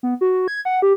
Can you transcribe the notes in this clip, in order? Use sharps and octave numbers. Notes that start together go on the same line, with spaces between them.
B3
F#4
G#6
F#5
G4